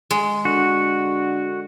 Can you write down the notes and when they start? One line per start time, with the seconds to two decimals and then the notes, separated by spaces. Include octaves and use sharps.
0.11 G#3
0.45 D3 F#4